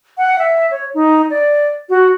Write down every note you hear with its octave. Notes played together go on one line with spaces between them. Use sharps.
F#5
E5
C#5
D#4
D5
F#4